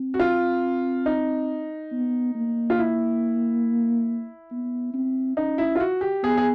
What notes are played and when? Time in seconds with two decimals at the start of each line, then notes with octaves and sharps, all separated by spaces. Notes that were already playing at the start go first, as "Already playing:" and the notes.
Already playing: C4
0.14 F#4
0.19 F4
1.06 D#4
1.92 B3
2.35 A#3
2.70 F4
2.79 E4
4.51 B3
4.94 C4
5.37 C#4 D#4
5.58 E4
5.75 F4
5.80 F#4
6.01 G4
6.23 B3 G#4
6.37 G#4